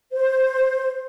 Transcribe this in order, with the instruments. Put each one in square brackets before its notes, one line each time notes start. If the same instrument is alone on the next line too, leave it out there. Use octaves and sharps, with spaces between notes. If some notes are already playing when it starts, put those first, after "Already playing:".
[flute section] C5